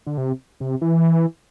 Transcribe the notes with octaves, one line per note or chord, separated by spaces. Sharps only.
D3
C3
C3
E3